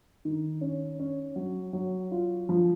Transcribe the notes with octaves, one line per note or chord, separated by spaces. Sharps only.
D#3
C#4
C#4
F#3
F#3
F4
F3